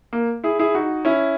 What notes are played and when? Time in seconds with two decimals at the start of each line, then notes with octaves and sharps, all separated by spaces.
0.13 A#3
0.44 E4 G#4
0.59 E4 G#4
0.75 D#4 F#4
1.05 C#4 E4